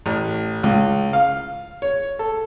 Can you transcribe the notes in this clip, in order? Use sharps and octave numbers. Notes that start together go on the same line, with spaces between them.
A1
C#2
F5
C#5
A4